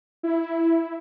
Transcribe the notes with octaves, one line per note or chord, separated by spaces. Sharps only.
E4